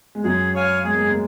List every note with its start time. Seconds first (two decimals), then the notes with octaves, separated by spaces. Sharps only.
0.15 G#3
0.24 F#2 F#3 G#4
0.55 C#5 F5 G#5
0.84 G#3 G#4
0.93 A#3
1.01 G#3
1.09 A#3